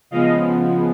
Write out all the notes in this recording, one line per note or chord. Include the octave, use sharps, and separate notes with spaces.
C#3 F3 G#3 B3 D#5 F5